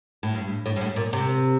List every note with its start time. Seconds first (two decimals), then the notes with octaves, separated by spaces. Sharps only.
0.23 A2
0.35 G2
0.66 A2
0.76 G2
0.81 A2
0.96 A#2
1.13 C3